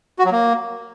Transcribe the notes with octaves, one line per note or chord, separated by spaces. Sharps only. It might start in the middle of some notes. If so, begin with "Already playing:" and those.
F#4
F#3
A#3